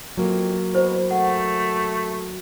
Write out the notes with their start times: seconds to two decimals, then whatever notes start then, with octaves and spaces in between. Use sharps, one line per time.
0.17 F2 F#3 A#3
0.73 B2 E4 C5 B5
1.11 A3 F#5